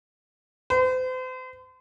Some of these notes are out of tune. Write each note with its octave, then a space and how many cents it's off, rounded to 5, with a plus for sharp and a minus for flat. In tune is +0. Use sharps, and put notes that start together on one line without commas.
C5 -40